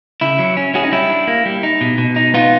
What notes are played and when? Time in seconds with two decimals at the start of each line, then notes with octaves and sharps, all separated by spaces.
0.21 C#3 E4
0.39 F#3
0.57 C#4
0.74 C#4 F#4 G#4
0.84 D#4
0.92 G3 E4
1.10 D4
1.27 A#3
1.45 G3
1.63 D#4
1.81 B2
1.98 B2
2.16 D#4
2.34 B3 D#4 F4